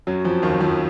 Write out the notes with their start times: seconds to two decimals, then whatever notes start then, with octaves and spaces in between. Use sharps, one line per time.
0.07 F#2 F#3
0.25 F2 F3
0.42 D#2 D#3
0.61 F2 F3